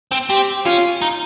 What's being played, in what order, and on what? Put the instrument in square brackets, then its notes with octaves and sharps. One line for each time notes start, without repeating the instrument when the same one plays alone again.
[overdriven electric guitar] C4
[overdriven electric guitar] C4 [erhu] G4
[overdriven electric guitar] C#4 [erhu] F4
[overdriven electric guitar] D#4